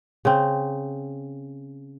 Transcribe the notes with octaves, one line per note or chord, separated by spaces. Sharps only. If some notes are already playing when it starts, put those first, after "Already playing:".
C#3 C4